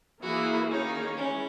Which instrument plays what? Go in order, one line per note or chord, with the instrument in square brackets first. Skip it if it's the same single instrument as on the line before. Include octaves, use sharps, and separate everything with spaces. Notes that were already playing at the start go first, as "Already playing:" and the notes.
[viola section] E3 A#3 E4 G#4 [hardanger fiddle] F#4
[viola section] D#3 A#3 C#4 G#4 C#5 [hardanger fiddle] D#4
[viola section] E3 G#3 [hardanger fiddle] C#4